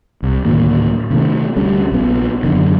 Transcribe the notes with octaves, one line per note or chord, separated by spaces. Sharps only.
C2
D2 A2 D#3 A#3
C3 D#3 A3
D2 G3 C#4
A#1 B3
F#2 D3 D#3